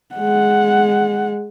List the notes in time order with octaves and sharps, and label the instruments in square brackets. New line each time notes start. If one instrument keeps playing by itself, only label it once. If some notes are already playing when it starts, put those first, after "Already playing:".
[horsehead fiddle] G#3 F#5